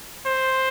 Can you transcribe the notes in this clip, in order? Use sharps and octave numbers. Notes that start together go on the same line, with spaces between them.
C5